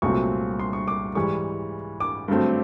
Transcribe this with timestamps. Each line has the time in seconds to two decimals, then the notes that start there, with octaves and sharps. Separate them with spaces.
0.02 C2 A#2 F#3 A3 C4 C#6
0.60 C6
0.73 C#6
0.88 D6
1.15 G#2 E3 G3 C#6
2.00 D6
2.28 G2 D3 F#3 A3 C4